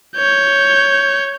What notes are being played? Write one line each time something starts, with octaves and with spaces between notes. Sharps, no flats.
C#5 G6